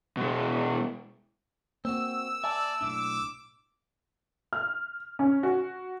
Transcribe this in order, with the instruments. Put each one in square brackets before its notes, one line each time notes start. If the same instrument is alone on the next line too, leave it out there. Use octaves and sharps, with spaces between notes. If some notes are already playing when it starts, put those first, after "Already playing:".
[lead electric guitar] B2 G#3
[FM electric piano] A#3 [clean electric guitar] C4 F#4 [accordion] E6
[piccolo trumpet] D5 [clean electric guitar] E5 G#5 A5
[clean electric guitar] B1 A2 D4 [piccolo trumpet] D6
[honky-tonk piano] F6
C#4
F#4